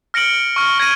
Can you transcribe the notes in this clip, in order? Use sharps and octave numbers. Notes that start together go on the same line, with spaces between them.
F6 A#6 C#7 D7 F#7
C#6 F6
F6 G#6 A#6 D#7